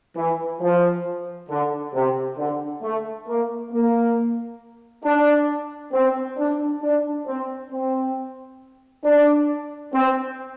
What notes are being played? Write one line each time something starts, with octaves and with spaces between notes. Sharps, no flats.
E3
F3
D3
C3
D3
A3
A#3
A#3
D4
C4
D4
D4
C4
C4
D4
C4